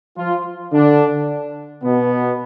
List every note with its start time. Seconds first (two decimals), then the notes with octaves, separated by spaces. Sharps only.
0.18 F3 F4
0.73 D3 D4
1.84 B2 B3